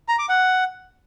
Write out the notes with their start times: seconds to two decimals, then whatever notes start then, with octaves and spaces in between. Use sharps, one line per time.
0.09 A#5
0.19 D6
0.29 F#5